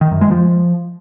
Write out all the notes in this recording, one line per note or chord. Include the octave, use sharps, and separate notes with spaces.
D#3
F#2
G#3
F3